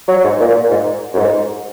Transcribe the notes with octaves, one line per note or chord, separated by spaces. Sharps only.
F#3
G#2
A#2
A#2
G#2
F#2
G#2